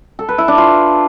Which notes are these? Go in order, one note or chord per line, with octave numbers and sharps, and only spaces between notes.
A4
B4
E4
D4
F4